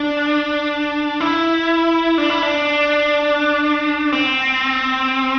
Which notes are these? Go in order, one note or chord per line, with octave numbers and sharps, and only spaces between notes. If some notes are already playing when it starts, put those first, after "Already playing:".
Already playing: D4
E4
D4
E4
D4
C4